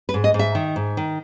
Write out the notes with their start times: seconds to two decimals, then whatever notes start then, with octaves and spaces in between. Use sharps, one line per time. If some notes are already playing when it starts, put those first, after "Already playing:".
0.09 B4
0.14 G#2
0.24 D#5
0.34 G#2
0.39 E5
0.55 D#3
0.76 G#2
0.97 D#3